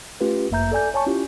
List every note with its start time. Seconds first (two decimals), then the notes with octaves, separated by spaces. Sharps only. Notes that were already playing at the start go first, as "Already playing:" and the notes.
0.21 A3 C#4 F4 G4 B4
0.50 G1 F#2 A#3 E5 A#5 G6
0.72 A4 D5 G#5 G6
0.94 C#5 G#5 A5 C#6
1.06 C#4 E4 F4 G4